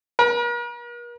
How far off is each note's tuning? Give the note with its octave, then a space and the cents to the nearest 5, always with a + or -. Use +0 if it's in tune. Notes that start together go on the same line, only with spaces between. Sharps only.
A#4 +45